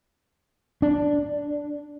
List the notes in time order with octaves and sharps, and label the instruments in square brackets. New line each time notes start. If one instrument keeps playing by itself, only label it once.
[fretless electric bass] D4